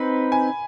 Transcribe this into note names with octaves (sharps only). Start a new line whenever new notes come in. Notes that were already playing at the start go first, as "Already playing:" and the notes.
Already playing: C4 D#4 B4 B5
G#5